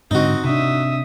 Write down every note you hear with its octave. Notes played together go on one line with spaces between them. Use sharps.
G#2 D3 C4 D#4 F#4 D#5
C3 D4 E5 D#6